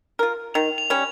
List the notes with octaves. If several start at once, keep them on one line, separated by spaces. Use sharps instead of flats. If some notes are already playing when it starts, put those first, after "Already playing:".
F4 A#4
D#3 F7
F7
G3 C#4